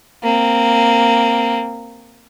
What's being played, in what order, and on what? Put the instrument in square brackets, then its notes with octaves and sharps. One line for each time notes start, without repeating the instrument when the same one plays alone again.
[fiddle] A#3 C4